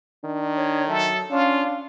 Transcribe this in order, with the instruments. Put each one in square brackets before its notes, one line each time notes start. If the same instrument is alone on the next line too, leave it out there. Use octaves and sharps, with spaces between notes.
[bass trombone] D#3 [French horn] D4
[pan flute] C#5
[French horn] F#3 [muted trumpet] A4 [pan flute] E5
[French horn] C#4 [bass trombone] D4 [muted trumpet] F4 [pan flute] F5